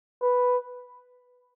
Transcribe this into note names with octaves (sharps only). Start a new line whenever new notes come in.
B4